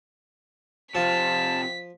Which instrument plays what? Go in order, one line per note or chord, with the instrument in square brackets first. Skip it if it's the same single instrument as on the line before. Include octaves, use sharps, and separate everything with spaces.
[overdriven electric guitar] C3 F4 [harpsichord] F3 [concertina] A5 [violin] B6